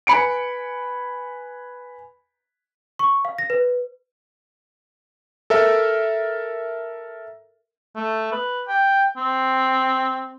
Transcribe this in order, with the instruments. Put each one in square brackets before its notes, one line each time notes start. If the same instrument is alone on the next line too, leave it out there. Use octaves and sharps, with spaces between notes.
[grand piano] B4 G#5 B5 C#7 D7
[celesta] C#6
F5
A#6
B4
[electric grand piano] A4 A#4 E5
[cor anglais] A3
B4
G5
C4